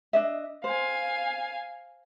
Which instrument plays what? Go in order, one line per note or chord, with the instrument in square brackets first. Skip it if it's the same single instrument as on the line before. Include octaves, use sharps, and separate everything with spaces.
[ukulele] D4 D#5 E5
[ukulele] C5 [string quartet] F5 G#5